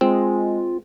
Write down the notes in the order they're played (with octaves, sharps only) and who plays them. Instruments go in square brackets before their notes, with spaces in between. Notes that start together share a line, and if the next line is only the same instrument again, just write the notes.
[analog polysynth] G#3 [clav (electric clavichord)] C4 [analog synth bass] F4